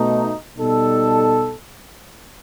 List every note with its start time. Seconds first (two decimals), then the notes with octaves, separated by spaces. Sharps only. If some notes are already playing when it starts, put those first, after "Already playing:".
Already playing: B2 A3 D#4
0.57 B2 G3 D#4 A4